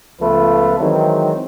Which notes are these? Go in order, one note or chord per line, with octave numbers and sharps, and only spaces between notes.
C#2 F3 A3 B3 F4 B4
D#3 E3 F#3 G#3 C4